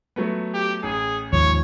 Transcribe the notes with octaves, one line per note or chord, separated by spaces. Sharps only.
F#3 A3 B3
G4
A1 G#4
D#2 G#2 F3 C#5